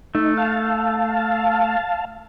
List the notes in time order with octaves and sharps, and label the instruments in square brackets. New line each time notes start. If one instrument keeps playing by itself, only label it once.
[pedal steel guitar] A3 [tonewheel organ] D#4
[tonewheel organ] F5 A5